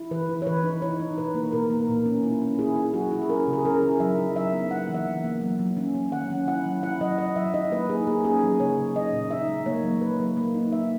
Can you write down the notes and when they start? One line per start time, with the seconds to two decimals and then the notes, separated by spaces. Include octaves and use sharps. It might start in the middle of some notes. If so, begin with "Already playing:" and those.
Already playing: E4
0.11 E3 B4
0.29 E4
0.42 C#5
0.47 E3 B4
0.64 D#4
0.82 D#4 C#5
1.00 D#4
1.17 B2 B4
1.35 A#3
1.52 B2 A#4
1.70 A#3
1.88 A#2
2.06 C#4
2.23 E4
2.41 C#4
2.59 E4 G#4
2.76 E4
2.94 F#3 F#4
3.12 E4
3.22 G#4
3.30 C#4 A#4
3.47 C#3
3.53 G#4
3.65 C#4 A#4
3.82 E4
4.00 F#3 E5
4.18 D#4
4.35 F#3 E5
4.53 B3
4.71 A#3 F#5
4.89 E3
4.94 E5
5.06 E3
5.24 A#3
5.41 F#3
5.59 F#3
5.77 C#4
5.94 F#3
6.12 D#3 F#5
6.30 C#4
6.47 E4 F#5
6.66 F#3
6.83 E4 F#5
7.01 F#3 D#5
7.18 F#3 D#5
7.36 F#3 E5
7.54 D#4 D#5
7.72 A#3 B4
7.89 D#4 G#4
8.07 A#3 G#4
8.25 C#4 G#4
8.43 F#3
8.60 C#3 C#5
8.77 C#3
8.95 D#4 D#5
9.13 A#2
9.31 D#4 E5
9.49 G#3
9.66 A#3 C#5
9.83 F#3
10.01 F#3 B4
10.19 F#3
10.37 A#3
10.54 D#4
10.72 D#4 E5